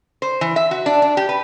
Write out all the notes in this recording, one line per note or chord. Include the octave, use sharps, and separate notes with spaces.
C5
E3
E5
F#4
D4
D4
G4
B4